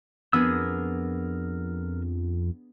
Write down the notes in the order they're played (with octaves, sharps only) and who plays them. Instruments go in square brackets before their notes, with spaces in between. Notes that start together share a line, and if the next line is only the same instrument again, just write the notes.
[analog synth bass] F2 [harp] B3 D4 G#4 [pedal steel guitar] A#4 E6